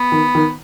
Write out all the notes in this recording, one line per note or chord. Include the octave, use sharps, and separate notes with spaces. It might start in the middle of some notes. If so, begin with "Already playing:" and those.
Already playing: B3
D#3
D#3